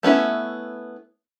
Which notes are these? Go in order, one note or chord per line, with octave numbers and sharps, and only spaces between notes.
A3 B3 C#4 E4